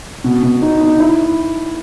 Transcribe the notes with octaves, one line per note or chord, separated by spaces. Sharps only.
B2
B2
D#4
D#4
E4